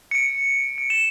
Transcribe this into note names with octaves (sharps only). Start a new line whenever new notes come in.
C#7
D7
D7
E7